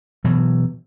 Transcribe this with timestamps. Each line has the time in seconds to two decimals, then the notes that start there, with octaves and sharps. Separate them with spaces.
0.24 B2 E3 F#3